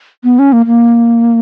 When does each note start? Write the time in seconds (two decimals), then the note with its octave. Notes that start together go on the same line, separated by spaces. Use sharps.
0.24 B3
0.39 C#4
0.53 A#3
0.66 A#3